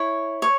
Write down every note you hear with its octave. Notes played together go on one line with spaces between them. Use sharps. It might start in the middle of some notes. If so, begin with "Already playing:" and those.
Already playing: E4 C#5
C#5